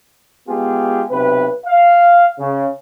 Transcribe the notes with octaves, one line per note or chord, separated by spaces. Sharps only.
G#3 B3 F4 G4 G#4
B1 C3 B4
F5
C#3